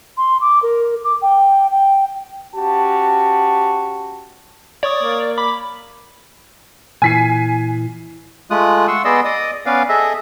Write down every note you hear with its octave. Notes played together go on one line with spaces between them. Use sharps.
C6
D6
A#4
D6
G5
G5
C#4 F#4 G4 A5
C#5 D5 C#6 D#6
A#3
B5 D6
A#2 E3 E4 G#5 B6 C7
G#3 A3 F4 D#6 F#6
F#5 C6 C#6 E6
B3 G#4 D5 D#5 C6 E6
D5 D#5 D#6
B3 C#4 B4 D5 F5
G#4 A4 D#5 E5